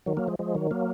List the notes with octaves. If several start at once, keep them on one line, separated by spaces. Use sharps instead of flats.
D#3 F#3
F#3 A#3
F3 G#3
F3 G#3
D#3 F#3
F#3 A#3